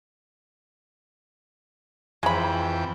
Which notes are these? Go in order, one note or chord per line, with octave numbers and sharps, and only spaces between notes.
F2 E3 G#3 G5 B5